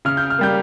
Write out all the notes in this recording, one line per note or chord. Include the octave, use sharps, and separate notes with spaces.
C#3 F6
G6
F6
G3 A#3 G6